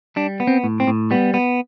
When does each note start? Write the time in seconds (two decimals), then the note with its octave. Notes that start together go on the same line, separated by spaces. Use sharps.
0.16 G3 D4
0.40 B3
0.47 C4
0.64 A2
0.80 C4
0.87 A2
1.11 G3 B3
1.34 B3